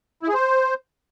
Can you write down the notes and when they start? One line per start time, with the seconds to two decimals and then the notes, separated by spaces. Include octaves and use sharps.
0.23 E4
0.29 G#4
0.34 C5